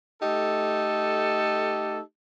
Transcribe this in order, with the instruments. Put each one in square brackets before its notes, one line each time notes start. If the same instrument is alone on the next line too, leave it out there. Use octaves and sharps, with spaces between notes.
[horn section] A3 D#4 G4 A4